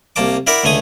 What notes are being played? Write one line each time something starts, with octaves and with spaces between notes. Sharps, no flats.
C2 A#3 A5 D6
E4 A#4 D5 E5 F#5
C#2 D3 A3 G#5 D#6